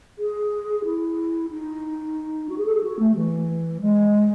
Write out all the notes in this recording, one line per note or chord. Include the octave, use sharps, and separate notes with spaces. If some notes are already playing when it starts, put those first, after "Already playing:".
G#4
E4
D#4
F#4
G#4
A4
G#4
F#4
A3
E3
G#3